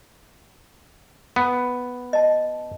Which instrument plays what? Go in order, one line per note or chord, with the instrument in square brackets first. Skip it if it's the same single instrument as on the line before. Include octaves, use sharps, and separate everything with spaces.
[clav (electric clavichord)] B3
[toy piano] D#5 A5